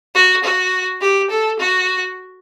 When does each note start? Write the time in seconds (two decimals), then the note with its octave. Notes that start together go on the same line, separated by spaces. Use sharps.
0.15 F#4
0.43 F#4
1.01 G4
1.30 A4
1.59 F#4